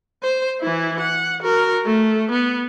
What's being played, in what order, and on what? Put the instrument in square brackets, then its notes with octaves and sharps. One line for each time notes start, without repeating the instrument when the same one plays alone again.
[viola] C5
E3 E4
F#5
F#4 A#4
A3
B3